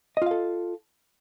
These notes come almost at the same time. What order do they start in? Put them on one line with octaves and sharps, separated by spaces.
D#5 F4 F5 A4